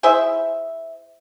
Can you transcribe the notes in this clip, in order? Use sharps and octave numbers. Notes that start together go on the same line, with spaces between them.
E4 G#4 C5 E5